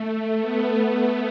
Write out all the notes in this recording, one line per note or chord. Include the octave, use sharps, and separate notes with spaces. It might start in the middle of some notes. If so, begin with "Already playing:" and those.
Already playing: A3
B3
B3